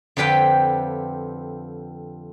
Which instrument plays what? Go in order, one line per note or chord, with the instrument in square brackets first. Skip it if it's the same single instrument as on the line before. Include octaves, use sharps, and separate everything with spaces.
[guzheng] F2 D3 G4 B4 G5